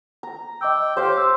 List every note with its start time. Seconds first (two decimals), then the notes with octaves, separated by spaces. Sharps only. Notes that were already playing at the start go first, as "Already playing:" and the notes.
0.23 A#5
0.61 D#5 G5 D6 E6
0.97 G4 C5 C#5 F5
1.17 C6 E6